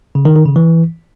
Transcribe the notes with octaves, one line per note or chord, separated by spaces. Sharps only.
C#3
D#3
D#3
C#3
E3